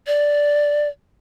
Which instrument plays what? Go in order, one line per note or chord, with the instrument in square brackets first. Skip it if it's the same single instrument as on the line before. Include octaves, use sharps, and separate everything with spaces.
[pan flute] D5